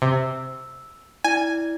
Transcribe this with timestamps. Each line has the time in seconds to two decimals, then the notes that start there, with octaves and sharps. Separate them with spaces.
0.02 C3 E6
1.24 E4 D5 G#5 G#6